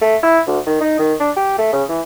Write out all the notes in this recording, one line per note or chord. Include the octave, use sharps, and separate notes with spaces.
A3
E4
D2
D#3
D#4
D#3
D4
G4
A3
C#3
E3